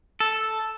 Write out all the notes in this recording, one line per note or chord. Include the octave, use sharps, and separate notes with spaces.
A4